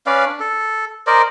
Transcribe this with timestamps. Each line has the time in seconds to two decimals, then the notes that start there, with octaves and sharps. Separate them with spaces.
0.06 C#4 B4 D5 F5
0.26 D4
0.40 A4
1.07 A#4 C5 D5 D#5